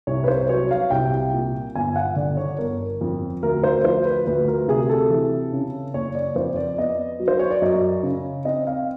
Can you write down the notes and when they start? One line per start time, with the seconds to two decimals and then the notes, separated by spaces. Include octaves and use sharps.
0.07 C2 C#5
0.24 B4
0.28 C5
0.49 F#3 C#5
0.71 F5
0.90 C2 G5
1.34 A#2
1.75 G1 G#5
1.96 F#5
2.16 D3 D5
2.37 C#5
2.58 G1 A#4
3.01 F2
3.43 D2 A#4
3.63 C5
3.84 F3 C5
4.05 B4
4.26 D2 B4
4.48 A#4
4.68 C3 G#4
4.89 A4
5.10 E3
5.52 C#3
5.94 F#1 C#5
6.15 D5
6.35 F2 C5
6.57 D5
6.77 B3 D#5
7.20 F#3
7.28 C5
7.39 C#5
7.51 D5
7.62 F#2 D#5
8.03 C#3
8.45 C4 D#5
8.67 F5